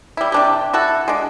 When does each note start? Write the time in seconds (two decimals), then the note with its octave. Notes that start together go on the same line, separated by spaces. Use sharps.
0.17 G3 E4
0.32 C3 D4 G4
0.73 E4 F#4 A4
1.08 G#3 D4